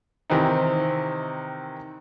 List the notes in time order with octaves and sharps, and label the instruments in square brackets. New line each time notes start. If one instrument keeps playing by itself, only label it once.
[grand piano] C3 D#3 E3 C4 D#4